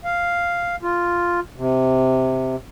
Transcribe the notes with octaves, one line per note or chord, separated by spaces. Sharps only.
F5
F4
C3